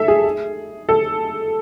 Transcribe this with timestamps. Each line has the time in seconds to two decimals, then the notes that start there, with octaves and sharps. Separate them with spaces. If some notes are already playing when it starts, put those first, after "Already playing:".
Already playing: A4 E5
0.08 G#4
0.89 A4